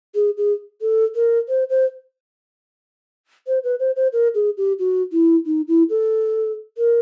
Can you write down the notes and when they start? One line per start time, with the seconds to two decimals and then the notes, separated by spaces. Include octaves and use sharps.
0.15 G#4
0.38 G#4
0.81 A4
1.15 A#4
1.49 C5
1.70 C5
3.47 C5
3.64 B4
3.80 C5
3.96 C5
4.13 A#4
4.35 G#4
4.58 G4
4.79 F#4
5.12 E4
5.46 D#4
5.68 E4
5.90 A4
6.78 A#4